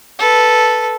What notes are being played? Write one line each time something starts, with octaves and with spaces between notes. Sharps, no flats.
A4 B4